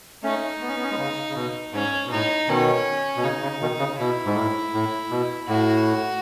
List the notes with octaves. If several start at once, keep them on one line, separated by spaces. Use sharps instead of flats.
A3 C#4 D#4
B3
C#4
B3
C#4
G#3 B3
C#3
C#3
B2
G#2 C#4
B2
A2 D#4
B2 D#3 C#4
B2
C#3 D#4
C#3
B2 D#3
C#3
B2 E4
G#2
A2
A2
B2
A2 F#4